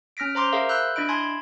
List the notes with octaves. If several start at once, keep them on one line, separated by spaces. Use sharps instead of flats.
C#4 F6 A#6 B6 D7
C5 A#5 C6 D6
G#4 A#4 C5 E5 F5
B5 E6 F#6 G6
D4 E4 D#5 B5 D7
G#5 A5 B5 C6 G#6